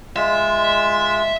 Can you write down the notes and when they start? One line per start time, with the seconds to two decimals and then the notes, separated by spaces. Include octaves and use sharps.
0.16 G#3 F4 E5